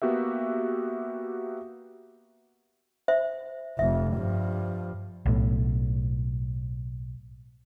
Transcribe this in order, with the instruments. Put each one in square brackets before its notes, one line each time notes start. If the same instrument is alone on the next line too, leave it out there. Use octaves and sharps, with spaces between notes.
[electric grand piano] A#3 B3 F#4 G4 E5
[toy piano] C5 E5
[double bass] F1 F2 [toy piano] E5
[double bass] G2 F3
[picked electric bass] B1 A2